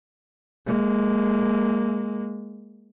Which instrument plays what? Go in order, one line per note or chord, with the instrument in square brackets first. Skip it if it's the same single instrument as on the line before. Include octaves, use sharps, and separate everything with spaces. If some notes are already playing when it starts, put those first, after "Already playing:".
[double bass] G#3 A#3